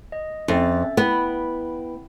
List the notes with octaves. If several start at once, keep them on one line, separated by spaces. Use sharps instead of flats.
D#5
F2 C#4 E5 A6
B3 E4 G5 B5